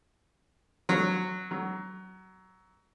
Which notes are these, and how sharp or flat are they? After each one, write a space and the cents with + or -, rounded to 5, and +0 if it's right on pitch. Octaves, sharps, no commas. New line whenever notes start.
F#3 -5
F#3 +20